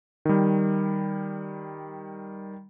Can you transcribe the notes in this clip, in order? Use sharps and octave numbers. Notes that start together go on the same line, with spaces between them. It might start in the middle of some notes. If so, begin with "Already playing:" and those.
D#3 G3